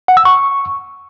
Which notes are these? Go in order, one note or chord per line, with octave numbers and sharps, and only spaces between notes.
F#5
E6
C#6